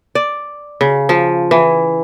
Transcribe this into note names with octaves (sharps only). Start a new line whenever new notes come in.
D5
C#3
F3
E3